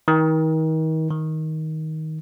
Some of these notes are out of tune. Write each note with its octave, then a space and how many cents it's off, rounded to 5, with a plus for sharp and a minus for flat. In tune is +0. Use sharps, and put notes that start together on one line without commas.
D#3 +35
D#3 +15